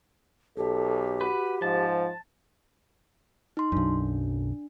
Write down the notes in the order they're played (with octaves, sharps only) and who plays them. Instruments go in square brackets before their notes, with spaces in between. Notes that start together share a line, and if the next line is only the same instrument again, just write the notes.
[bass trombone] B1 [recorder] G4 [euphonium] A4
[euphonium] F#4 [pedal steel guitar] B4
[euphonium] G#2 [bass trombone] F3 [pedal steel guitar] A5
[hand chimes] D#4 C6
[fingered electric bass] B1 F#2 [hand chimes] D4